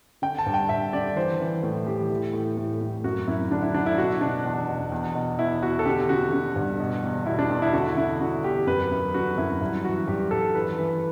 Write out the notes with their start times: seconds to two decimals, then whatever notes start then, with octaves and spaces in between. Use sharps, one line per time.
0.22 D3 G5
0.38 A5
0.46 G2
0.54 G5
0.69 G2 E5
0.93 D3 D5
1.16 E3 C5
1.40 E3
1.63 A2
1.86 E3 G4
2.10 A2
2.33 A2
2.57 A2
2.81 A2
3.04 F#2 F#4
3.27 F#2 E4
3.51 D3 D4
3.62 E4
3.74 D3 D4
3.86 E4
3.97 B2 F#4
4.21 B2 D4
4.45 E2
4.68 B2
4.92 E2
5.15 B2
5.38 E2 E4
5.63 B2 F#4
5.79 A4
5.85 D3 G4
6.09 D3 F#4
6.33 D3
6.56 G2
6.80 B2
7.03 E2
7.26 B2 E4
7.39 D4
7.50 E2
7.62 E4
7.73 D3 F#4
7.96 D3 E4
8.20 D3 F#4
8.44 E2 G4
8.67 F#2 B4
8.91 F#2
9.14 D3 F#4
9.38 F#2 E4
9.61 G2 E4
9.84 E3 F#4
10.08 G2 G4
10.31 G2 A4
10.55 E3 B4
10.78 E3 B4